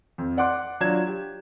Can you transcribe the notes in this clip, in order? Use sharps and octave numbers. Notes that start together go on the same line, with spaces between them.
F2
D5 F#5 C6 D6 F#6
F#3 D4 F4 G#6 E7
G4